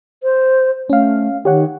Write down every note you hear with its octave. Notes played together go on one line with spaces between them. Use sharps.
C5
A3 C#4 F5
D#3 G4 C#5 F#5